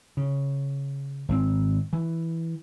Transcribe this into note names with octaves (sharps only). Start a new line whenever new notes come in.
C#3
G#1 C#3 C4
E3